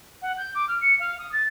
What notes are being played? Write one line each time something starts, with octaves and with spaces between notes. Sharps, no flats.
F#5
G6
D6
F6
C#7
F5
D#6
A6